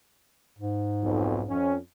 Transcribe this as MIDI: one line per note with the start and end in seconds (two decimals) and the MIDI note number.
0.58 1.51 44
1.03 1.41 35
1.03 1.41 41
1.49 1.77 41
1.49 1.77 61